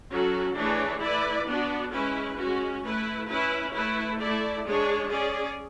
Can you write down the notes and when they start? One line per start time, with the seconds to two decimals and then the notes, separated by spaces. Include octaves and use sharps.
0.11 F#3 C#4 F#4 A4
0.56 E3 A3 D4 G#4 C#5
1.02 A3 E4 B4 D5
1.47 B3 D4 F#4
1.93 G#3 C#4 E4 B4
2.38 G#3 C#4 F#4
2.84 A3 E4 B4
3.28 C#4 E4 B4
3.74 A3 E4 B4
4.19 A3 E4 A4 D5
4.64 G#3 D4 G#4 C#5
5.10 C#4 G#4 D5